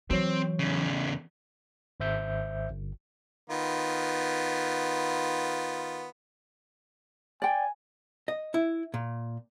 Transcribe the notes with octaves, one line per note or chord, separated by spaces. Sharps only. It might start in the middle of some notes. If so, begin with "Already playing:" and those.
E3 F#3 C4 C#5
E2 C#3
G#1 C5 E5 G6
G1
D#3 B3 F4
D5 G5 G#5
D#5
E4
A#2